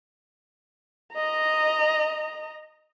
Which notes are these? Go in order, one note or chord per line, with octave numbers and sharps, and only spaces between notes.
D#5 A#5